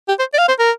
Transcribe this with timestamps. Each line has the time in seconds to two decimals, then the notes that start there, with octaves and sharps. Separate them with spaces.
0.08 G4
0.19 C5
0.34 D5
0.38 F5
0.48 C5
0.59 A#4